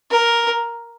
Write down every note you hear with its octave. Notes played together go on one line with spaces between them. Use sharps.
A#4